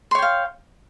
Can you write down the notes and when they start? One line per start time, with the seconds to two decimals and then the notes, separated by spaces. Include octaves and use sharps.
0.11 C6
0.15 C#5
0.19 G5
0.22 F5